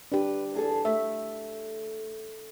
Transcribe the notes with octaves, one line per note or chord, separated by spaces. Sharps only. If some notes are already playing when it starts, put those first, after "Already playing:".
D4 G4 B4
E2 G#4 A4
A3 E5